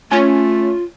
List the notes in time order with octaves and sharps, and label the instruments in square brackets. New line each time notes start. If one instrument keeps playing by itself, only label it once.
[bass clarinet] A3 [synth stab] C#4 [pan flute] F4